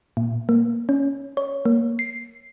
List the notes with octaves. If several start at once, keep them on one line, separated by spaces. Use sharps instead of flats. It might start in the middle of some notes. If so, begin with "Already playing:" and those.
A#2
A#3
C#4
C#5
A#3
C7